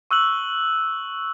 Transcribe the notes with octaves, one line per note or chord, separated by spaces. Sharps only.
C#6 E6 F#6 F#7